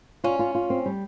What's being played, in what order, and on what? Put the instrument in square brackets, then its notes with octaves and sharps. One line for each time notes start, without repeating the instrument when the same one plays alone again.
[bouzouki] C#4 [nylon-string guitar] F4
[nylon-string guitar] F4
F4
C4
G3